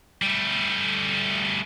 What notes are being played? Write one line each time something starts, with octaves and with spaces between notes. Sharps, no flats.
G3 A3